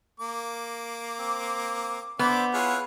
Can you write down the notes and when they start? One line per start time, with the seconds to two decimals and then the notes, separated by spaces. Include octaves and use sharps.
0.20 A#3 D6
1.18 C4
2.19 B3 D4 C5 E5 D6
2.54 E4 F4 G#4 B4 C#5